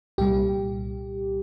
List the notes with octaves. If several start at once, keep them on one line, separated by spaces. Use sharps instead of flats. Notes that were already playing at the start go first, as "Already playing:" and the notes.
C2 A#2 G3 G4